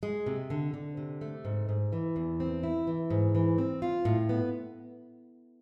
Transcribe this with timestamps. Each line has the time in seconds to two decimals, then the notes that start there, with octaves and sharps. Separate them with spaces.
0.03 G#3
0.26 C3
0.50 D3
0.74 D3
0.97 C3
1.21 A3
1.45 G#2
1.69 G#2
1.93 E3
2.16 E2
2.40 C4
2.63 E4
2.87 E3
3.10 G#2
3.35 E3
3.58 C4
3.82 F4
4.05 A2
4.29 B3